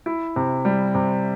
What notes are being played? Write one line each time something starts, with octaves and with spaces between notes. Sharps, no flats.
E4
C3
G3
C3